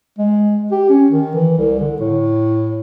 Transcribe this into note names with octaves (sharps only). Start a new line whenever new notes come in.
G#3
G4
C#4
D#3
E3
C2
D3
A2